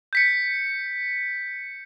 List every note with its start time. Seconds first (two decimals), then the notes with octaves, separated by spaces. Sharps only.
0.13 G6 B6 C#7